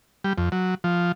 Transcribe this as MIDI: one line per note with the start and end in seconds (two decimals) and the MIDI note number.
0.24 0.33 55
0.38 0.49 41
0.52 0.75 54
0.84 1.12 53